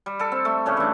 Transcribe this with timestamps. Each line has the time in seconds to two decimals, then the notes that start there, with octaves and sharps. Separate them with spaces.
0.06 G3
0.19 G3 A4
0.32 C4
0.45 A3
0.66 A2 C#3 G3 C#4
0.77 E3 D4